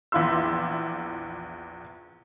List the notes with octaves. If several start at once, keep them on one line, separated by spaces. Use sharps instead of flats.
A#1 E2 E4 F4 C6 E6